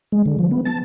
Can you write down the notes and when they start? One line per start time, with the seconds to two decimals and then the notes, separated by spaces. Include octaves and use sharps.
0.12 G#3
0.26 D3
0.39 F3
0.51 B3
0.65 A5